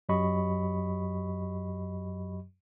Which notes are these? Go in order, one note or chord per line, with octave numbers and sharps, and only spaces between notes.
F#2 F#3 G4 D#5 B5 C#6